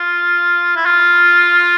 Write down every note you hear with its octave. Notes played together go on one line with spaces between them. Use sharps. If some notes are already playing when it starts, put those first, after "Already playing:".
Already playing: F4
E4
F4